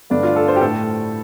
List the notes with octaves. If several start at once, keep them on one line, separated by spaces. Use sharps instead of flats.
G2 D3 A3 D4
F4
A4
C5
G4
A2 A3 A4